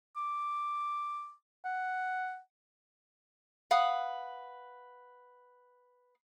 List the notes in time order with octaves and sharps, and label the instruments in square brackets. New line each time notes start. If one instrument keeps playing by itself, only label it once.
[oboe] D6
F#5
[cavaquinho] B4 F5 F#5 D#6